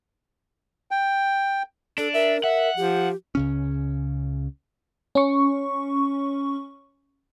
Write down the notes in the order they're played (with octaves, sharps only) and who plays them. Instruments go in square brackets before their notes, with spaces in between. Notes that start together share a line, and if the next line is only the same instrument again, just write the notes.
[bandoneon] G5
[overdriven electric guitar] D4 [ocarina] A4
[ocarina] A#4 [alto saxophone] E5
[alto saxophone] E5 [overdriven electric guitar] F#5
[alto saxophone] F3 [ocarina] G4
[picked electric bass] C#2 C#3 C#4
[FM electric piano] C#4 C#6